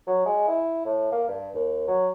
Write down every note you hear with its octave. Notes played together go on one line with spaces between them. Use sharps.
F#3
G#3
E4
A2
A#3
G2
D#2
F#3